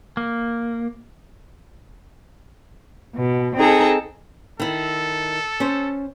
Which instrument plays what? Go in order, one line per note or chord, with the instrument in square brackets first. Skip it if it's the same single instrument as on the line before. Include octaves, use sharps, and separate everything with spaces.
[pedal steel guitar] A#3
[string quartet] B2
C4 D#4 G#4 A4 A#5
[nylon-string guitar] D#3 E4 [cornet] A4
[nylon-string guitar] C#4 C5